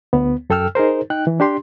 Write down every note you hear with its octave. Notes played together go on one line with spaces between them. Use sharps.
D2 B3
F#2 A4 G5 E6 F6
D#4 G#4 A#4 C5
D#4 G5 F#6
E3
D4 G4 C6